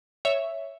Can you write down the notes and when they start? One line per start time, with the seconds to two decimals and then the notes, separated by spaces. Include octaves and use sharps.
0.25 C#5 E5